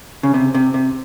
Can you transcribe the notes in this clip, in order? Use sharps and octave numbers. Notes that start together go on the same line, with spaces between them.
C#3
C3
C3
C3